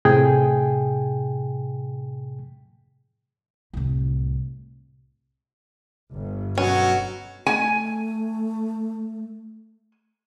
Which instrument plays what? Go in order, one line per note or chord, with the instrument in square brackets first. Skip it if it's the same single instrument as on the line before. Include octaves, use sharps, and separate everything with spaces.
[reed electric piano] A2 C3 G#4 G5 G#5
[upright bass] C2 A2
[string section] G1
[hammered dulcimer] B2 [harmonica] F#3 [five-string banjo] C#4
[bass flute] A3 [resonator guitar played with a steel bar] G#5